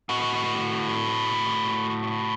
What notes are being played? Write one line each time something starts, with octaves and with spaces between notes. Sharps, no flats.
A2 F#4